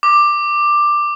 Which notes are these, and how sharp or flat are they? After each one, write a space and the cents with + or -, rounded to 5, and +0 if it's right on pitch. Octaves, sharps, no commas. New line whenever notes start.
D6 +10